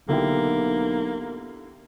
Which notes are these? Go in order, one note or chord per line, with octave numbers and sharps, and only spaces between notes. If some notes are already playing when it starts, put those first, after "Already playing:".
B1 D3 A#3 E4 G4